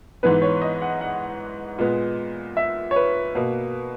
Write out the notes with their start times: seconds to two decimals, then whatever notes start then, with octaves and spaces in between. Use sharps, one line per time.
0.23 G#2 E3 B3 B4
0.42 C#5
0.62 D#5
0.82 F#5
1.01 F#5
1.78 A#2 G#3 B3
2.57 E5
2.91 C#5
2.96 B4
3.35 B2 A#3 B4